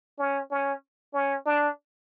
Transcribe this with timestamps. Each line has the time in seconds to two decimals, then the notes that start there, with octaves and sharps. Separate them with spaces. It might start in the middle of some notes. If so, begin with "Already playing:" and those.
0.19 C#4
0.51 C#4
1.14 C#4
1.46 D4